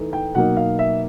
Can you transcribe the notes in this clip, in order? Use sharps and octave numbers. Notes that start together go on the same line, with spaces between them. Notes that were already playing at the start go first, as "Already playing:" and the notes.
Already playing: E3 A3 D#4
G5
B2 F#3 A#3 D#4 F#5
F5
E5